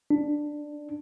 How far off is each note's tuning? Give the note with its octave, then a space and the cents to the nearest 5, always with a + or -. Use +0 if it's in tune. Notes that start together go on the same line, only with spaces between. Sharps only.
D4 +10